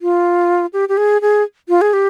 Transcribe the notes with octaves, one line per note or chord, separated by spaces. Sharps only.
F4
G4
G4
G#4
G#4
F4
G#4
G4